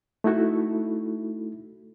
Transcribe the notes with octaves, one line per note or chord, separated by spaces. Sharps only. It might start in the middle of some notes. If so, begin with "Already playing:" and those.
A3 D#4 E4 F#4 A4